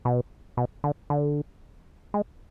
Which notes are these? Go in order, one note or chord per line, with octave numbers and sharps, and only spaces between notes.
B2
B2
D3
D3
G#3